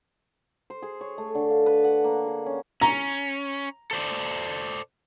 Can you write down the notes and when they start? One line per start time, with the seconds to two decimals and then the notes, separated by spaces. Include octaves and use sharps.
0.70 C5
0.82 G#4
1.01 C#5
1.18 A3
1.35 D3
1.50 F5
1.66 B4
1.84 F#5
2.04 A#3
2.26 G#4
2.46 C#4
2.82 C#4 A#5
3.91 A4 C5 D5